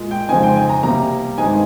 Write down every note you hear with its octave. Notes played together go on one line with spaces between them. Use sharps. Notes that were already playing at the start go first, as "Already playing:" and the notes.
Already playing: A#2 G#3
G5
F2 C#3 G#3 C4 D#4 G#5
G5
G#5
A#5
C3 G3 A#3 A#5
G2 D#3 G#3 C4 D#4 G#5